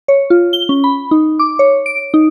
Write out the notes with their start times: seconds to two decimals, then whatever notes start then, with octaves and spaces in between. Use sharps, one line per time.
0.08 C#5
0.30 F4
0.53 G7
0.69 C#4
0.84 B5
1.11 D#4
1.39 D6
1.59 C#5
1.86 D7
2.14 D#4